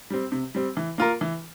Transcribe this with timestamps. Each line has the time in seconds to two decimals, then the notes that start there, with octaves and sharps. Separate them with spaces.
0.10 G3 C4
0.32 C3
0.55 G3 C4
0.77 E3
0.98 A#3 F4 A#4
1.21 E3